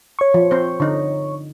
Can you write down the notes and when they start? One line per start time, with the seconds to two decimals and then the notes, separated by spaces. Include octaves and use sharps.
0.19 C#5 C#6
0.34 F3
0.51 C4 C5
0.80 D3 D#4